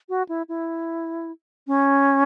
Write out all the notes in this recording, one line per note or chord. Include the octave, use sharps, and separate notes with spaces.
F#4
E4
E4
C#4